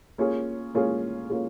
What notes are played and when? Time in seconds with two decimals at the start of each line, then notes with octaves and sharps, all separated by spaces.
0.18 A#3 C#4 F4 G#4
0.74 A#3 C#4 F4 G#4
1.30 A#3 C#4 F4 G#4